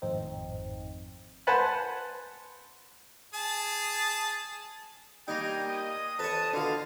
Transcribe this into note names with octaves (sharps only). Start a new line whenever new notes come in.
G#1 F2 A2 C4 D#4
B4 C5 F#5 G#5 A5 B5
G#4 A5
G3 A#3 D#4 G5 G#5 A#5
G#3 D#5 D#6
F2 B4 C#5 A5
B2 D3 F4 D#5 F5